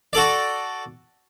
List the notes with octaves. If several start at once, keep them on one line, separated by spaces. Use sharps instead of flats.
F#4 A4 D5